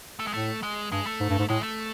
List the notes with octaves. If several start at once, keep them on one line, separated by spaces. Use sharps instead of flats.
A3
G#3
A2 A3
G#3
G2 G#3
A3
G#2
G2
G#2
A2 G#3
A3